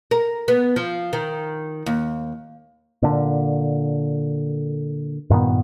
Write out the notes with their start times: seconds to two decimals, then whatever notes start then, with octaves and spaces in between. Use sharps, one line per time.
0.11 A#4
0.48 B3
0.76 F3
1.13 D#3
1.86 D#2
3.02 A#2 D3
5.30 G2 A#2 D#3 B3